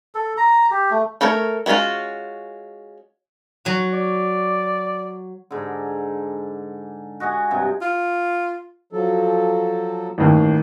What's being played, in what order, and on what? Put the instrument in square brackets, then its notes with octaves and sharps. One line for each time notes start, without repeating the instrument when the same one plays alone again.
[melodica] A4
A#5
G4
A3
[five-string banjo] A3 A4 A#4 C#5
G#3 B3 C#4 F4 F#4
[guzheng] F#3 F#4
[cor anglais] D5
[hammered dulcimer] G#2 D3
F#4 D#5 F#5 G#5
G2 C3
[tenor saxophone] F4
[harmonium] F3 F#3 A4
[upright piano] A1 D#2